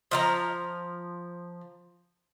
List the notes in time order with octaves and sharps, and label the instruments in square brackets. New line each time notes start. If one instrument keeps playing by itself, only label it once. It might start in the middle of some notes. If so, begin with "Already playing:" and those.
[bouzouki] F3 E5 A#5